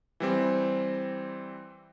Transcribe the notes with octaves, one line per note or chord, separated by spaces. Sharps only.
E3 G3 C4